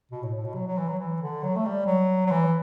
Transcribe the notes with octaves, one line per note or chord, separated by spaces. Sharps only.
B2
A2
A2
B2
F#3
F#3
E3
F#3
E3
D3
F#3
A3
G3
F#3
F#3
E3